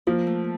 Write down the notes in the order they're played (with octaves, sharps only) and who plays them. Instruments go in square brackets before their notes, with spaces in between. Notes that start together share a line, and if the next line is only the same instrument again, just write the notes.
[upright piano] F3 [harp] A#3
[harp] A3